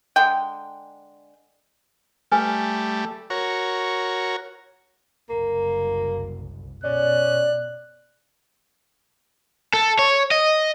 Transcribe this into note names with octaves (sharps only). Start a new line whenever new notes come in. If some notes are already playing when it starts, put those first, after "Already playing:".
D3 G#3 G5
G3 A3 B4 G#5
F#4 A#4 C#5
F#1 C2 A#3
B2 C#4 D5 F#6
A4
C#5
D#5